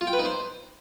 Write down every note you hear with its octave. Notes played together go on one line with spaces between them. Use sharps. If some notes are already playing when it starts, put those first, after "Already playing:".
F4
G5
B4
D#4
C5